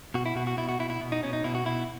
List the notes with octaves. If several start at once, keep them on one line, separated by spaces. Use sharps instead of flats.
B2 F#4
E4
B2 F#4
F#4
B2 E4
F#4
B2 E4
E4
B2
D#4
B2 C#4
D#4
B2 E4
F#4
B2 E4